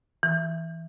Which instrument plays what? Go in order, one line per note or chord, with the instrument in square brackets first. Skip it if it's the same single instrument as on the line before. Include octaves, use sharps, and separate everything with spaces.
[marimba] E3